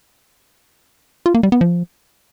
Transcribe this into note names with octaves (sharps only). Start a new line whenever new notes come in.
F4
A#3
G3
B3
F3